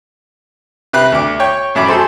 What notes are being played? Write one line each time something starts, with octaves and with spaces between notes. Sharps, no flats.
C3 B4 F#6
D2 D6
C#5 G5
A1 F#2 B5 D6
F#3 G#4 A4 C5